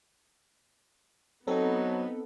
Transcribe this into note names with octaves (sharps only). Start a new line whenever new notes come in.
F#3 B3 C4 D#4 A4